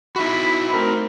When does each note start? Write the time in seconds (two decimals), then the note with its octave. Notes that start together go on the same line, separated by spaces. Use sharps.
0.16 D#4 E4 F#4 E5 B5
0.73 A3 C4 A#4